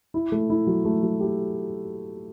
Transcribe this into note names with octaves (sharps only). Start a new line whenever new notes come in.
E4
A3
E4
F#3
A3
F#3
G4